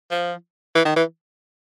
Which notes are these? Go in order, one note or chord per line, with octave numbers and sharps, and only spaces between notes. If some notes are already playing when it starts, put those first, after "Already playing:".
F3
E3
D#3
E3